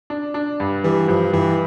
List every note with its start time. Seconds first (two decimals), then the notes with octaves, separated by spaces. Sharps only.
0.10 D4
0.34 D4
0.60 G2
0.84 E3 G3
1.08 G2 F3
1.33 G2 E3